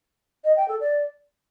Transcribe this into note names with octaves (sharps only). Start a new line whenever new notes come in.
D#5
G5
A4
D5